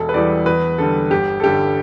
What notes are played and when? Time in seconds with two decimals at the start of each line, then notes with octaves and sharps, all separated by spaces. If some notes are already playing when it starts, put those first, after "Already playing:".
Already playing: E1 A4
0.09 B4
0.14 E2 E3 G3 D5
0.46 E2 B4
0.78 D3 G3 A4
1.11 G1 G4
1.40 A4
1.44 G2 D3 G3 G4